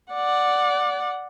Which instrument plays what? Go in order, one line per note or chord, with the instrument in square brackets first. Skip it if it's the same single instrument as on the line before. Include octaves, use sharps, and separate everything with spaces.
[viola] D5 F#5